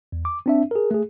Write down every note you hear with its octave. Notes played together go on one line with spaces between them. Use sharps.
E2
D6
C4 D4 E5
G#4 A#4
A3 G#4